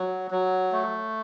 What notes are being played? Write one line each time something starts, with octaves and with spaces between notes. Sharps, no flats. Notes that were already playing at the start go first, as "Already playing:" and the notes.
Already playing: F#3
F#3
A3